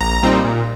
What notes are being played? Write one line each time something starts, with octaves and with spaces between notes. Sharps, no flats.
A#1 A#5
A#2 G3 C4 D#4
A#2